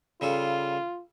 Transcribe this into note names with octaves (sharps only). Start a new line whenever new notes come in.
C#3 G3 F4 A4